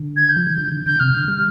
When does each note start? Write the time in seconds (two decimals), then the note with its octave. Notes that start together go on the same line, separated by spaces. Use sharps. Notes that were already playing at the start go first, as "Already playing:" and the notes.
Already playing: D3
0.16 G#6
0.29 G6
0.37 F3
0.47 D#3
0.58 D3
0.72 D3
0.86 D3 G6
1.00 C3 F6
1.15 D3
1.28 G3